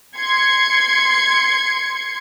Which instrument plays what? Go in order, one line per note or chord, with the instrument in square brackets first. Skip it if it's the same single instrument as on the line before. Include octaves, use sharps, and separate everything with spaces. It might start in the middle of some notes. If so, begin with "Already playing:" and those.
[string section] C6 G#6 C#7